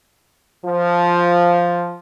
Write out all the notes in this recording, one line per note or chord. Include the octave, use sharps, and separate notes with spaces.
F3